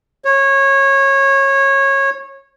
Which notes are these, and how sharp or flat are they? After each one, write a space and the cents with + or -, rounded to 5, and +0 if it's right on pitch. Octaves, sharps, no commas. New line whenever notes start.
C#5 -20